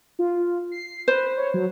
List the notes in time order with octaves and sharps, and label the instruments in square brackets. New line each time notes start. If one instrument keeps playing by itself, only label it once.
[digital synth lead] F4
C7
[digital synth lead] B4 [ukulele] C5
[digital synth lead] C#5
F#3